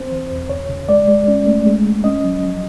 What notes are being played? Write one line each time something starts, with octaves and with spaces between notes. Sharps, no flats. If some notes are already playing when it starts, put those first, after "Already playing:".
Already playing: C4 C5
E3
E2
C#3 C#5
C#3
G#3 D5
G#3
C#4
A3
G#3
G#3
C#4 D#5
F#3
F3